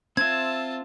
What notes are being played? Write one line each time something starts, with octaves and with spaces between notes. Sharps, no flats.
C4 F4 E5 A5 G#6